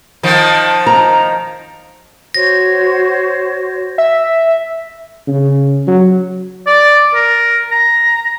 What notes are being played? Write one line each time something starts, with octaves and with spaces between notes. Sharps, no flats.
D#3 F3
A#5
F#4 C5 C#5 A#6
E5
C#3
F#3
D5
A#4
A#5